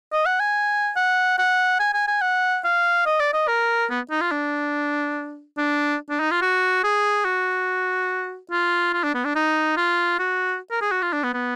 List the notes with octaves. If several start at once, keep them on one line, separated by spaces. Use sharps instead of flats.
D#5
F#5
G#5
F#5
F#5
G#5
G#5
G#5
F#5
F5
D#5
D5
D#5
A#4
B3
D#4
F4
D4
D4
D4
D#4
F4
F#4
G#4
F#4
F4
F4
D4
B3
D4
D#4
F4
F#4
A#4
G#4
F#4
F4
D4
B3
B3